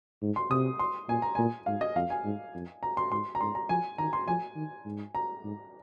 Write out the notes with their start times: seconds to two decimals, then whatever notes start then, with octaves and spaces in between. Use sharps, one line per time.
0.22 G#2
0.36 C6
0.50 C3 D#6
0.79 C6
1.08 A#2 G#5
1.22 A#5
1.35 A#2 G#5
1.66 G#2 F5
1.81 D#5
1.95 F2 F5
2.10 G#5
2.24 G#2
2.54 F2
2.83 A#5
2.97 C6
3.11 G#2 C6
3.35 A#5
3.41 G#2 C6
3.55 A#5
3.69 F3 G#5
3.98 D#3 A#5
4.13 C6
4.27 F3 G#5
4.56 D#3
4.85 G#2
5.15 A#5
5.44 G#2